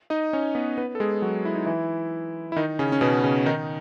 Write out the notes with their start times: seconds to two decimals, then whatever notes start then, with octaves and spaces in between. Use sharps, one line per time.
0.10 D#4 D#5
0.33 C#4 C#5
0.55 B3 B4
0.78 B3 B4
0.95 A4
1.00 G#3 G#4
1.22 F#3 F#4
1.45 E4
1.55 D#4
1.66 E3 E4
2.52 E4
2.56 D#3 D#4
2.79 C#3 C#4
2.92 C#4
3.01 B2 B3
3.24 C#3 C#4
3.46 D#3 D#4